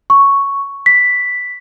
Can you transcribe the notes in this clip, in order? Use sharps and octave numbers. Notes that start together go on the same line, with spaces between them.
C#6
B6